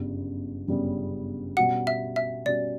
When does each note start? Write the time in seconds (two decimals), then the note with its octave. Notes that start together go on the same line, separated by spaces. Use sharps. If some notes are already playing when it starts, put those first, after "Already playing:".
Already playing: G1 F#2 C#3 G3 B3
0.67 G1 F#2 C#3 G3 B3
1.57 B2 G3 C#4 F#4 F#5
1.87 E5
2.16 E5
2.46 B2 G3 C#4 F#4 D5